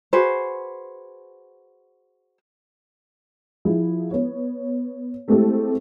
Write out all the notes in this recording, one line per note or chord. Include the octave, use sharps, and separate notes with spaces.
F#4 G#4 B4 C5
F3 E4 G#4
B3 C#5
G#3 A3 C4 E4 G4 A4